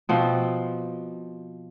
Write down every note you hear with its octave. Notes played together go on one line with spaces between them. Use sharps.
B2 F3 C4 F#4